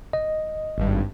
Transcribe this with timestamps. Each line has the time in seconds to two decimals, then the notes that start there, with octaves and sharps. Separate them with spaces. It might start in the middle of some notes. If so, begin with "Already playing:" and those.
0.13 D#5
0.78 G#1 G2